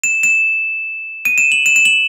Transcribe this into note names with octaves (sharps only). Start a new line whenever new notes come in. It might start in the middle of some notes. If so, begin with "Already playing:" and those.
E7
E7
D#7
E7
F#7
E7
E7
F#7